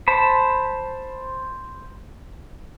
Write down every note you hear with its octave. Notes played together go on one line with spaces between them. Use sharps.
C5 A5 B5